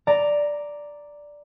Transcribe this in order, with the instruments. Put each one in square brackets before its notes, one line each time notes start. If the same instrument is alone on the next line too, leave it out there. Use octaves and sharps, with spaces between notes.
[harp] D5 A#5 A#6